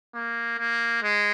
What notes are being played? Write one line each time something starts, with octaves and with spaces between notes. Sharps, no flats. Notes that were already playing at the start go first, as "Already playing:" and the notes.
A#3
A#3
G#3